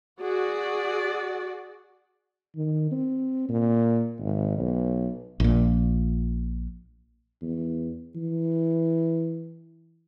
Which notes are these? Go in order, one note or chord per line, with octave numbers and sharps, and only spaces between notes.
F#4 G#4 D5
D#3
C4
A#2
G#1
B1
A#1 A#2
E2
E3